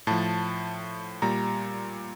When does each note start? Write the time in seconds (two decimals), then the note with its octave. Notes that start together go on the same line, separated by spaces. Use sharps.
0.07 A2 F3 A5
1.22 A#2 G3 A#5